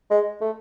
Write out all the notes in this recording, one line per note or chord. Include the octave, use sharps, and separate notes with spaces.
G#3
A3